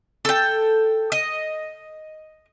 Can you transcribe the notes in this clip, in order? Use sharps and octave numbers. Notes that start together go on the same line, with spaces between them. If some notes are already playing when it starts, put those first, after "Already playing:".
A4 G5
D#5